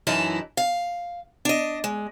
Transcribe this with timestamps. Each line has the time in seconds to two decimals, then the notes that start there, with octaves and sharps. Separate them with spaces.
0.07 F#2 E3 D#4 E4 A5
0.57 F5
1.45 D4 D#5
1.84 G#3